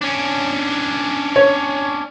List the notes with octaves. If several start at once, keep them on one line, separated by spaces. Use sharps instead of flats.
C#4 D4
C#5